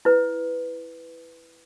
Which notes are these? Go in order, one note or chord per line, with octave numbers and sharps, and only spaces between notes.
E4 B4